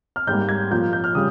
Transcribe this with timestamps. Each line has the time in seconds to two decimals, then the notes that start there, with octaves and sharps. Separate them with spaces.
0.16 F6
0.27 G#2 G3 A#3 G6
0.49 G#6
0.71 A#2 F3 A#3 G6
0.93 G6
1.04 F6
1.15 C#3 G3 D#6